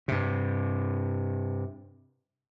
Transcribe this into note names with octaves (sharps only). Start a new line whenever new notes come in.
G2 C3